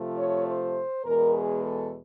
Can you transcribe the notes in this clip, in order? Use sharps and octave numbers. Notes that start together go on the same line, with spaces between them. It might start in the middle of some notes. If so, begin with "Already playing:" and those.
Already playing: C3 F3 A3
C#5
C5
E2 B2 G#3 A#4
G#4
A4